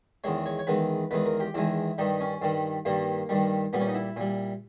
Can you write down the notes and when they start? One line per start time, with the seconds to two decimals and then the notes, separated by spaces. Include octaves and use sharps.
0.24 E2 D#3 G#3 C#5
0.46 C#5
0.59 C#5
0.67 E2 D#3 G#3 B4
1.11 E2 D#3 G#3 B4
1.26 A#4
1.40 G4
1.54 E2 D#3 G#3 E4
1.98 G2 D#3 G3 D#4
2.20 C#4
2.42 G2 D#3 G3
2.85 G2 D#3 G3 A#3
3.29 G2 D#3 G3
3.73 A#2 G3 B3
3.80 C#4
3.87 D#4
3.95 E4
4.16 A#2 G3